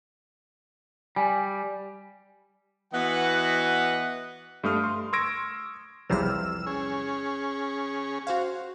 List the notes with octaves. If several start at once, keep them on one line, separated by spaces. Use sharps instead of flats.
G3 G#5
E3 B3 F#4 B4 D#5 F#5
G2 A3 D#6 F6
C6
C6 C#6 E6 G#6 A#6 D7
B1 E2 C3 F3 G3 E6 F6
C#4 G#4
F#4 C5 F5